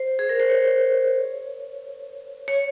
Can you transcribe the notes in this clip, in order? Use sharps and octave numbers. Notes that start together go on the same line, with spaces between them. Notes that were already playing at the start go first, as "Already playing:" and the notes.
Already playing: C5
G#4
A#4
C5
C#5
C#5